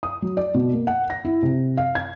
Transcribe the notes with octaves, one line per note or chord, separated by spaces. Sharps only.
D#6
F#3
D5
B2
A#3
F#5
A#6
E4
C3
F5
G#6